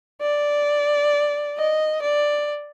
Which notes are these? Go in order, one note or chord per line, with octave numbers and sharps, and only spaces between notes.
D5
D#5
D5